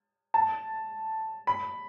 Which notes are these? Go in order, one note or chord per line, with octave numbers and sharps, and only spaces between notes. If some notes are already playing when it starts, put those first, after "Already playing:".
A5
B5